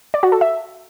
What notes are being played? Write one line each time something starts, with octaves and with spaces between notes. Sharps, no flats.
D5
F#4
A4
E5